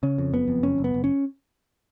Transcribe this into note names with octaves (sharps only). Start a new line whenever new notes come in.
C#3 C#4
F2
F#1 B3
F2
F#1 C#4
F#1
B3
F#1
C#4